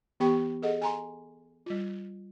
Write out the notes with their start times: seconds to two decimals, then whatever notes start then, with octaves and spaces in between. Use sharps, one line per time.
0.20 E3 B3 G4 G5 B5 C#6
0.62 G#4 A4 D#5 F#5
0.82 G#5 A#5 C6
1.66 G3 F4